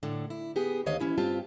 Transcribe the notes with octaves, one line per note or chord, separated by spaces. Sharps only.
A2 D3
E4
B3 G4 G#4
D2 D#3 C#5 D#5 F5
E3 C#4 E4
G2 C4 F4 G4 A5